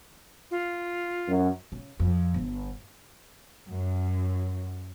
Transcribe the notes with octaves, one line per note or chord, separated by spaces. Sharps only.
F4
F#2
C#3
F2
G1
F#2